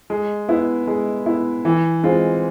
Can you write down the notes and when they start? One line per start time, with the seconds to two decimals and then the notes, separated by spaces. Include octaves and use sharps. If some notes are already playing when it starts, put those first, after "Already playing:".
0.10 G#3
0.49 B3 E4
0.87 G#3
1.26 B3 E4
1.65 E3
2.03 G#3 C4 F4